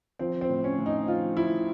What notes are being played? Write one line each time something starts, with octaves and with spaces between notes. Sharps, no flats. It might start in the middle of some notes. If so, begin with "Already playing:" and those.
F3 C4
C4
A2
C#4
A2
D#4
F3 F4
F3 E4